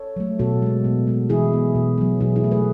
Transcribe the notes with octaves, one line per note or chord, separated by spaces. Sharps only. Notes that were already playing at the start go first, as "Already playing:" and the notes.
Already playing: A4 C#5
F#3 A3
B2 F#4 A4
G#3 B3
B2
G#3 B3
E3 E4 G#4
B3
B2
F#3 B3
B2 E4 G#4
E4 G#4
A3
G#4 B4